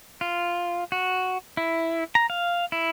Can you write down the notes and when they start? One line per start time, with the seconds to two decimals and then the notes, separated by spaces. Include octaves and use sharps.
0.21 F4
0.92 F#4
1.57 E4
2.15 A#5
2.30 F5
2.72 E4